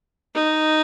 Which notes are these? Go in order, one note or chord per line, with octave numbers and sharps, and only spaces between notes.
D#4